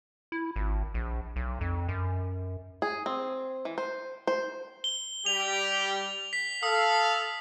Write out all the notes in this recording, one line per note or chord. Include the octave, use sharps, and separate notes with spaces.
E4
G#1
A#1
B1
F2
F#2
G#4
C4
E3
C5
C5
G7
G3 G4 F7
B6
A4 F5 D#6